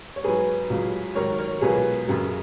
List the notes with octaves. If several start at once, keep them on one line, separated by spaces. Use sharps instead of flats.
C#5
G#2 F#3 G#4 B4
C#2 C#3 F#3
G#2 D#3 F#3 A#4 C#5
A#4 C#5
C#2 B2 F#3 G#4 B4
F#2 C#3 F#3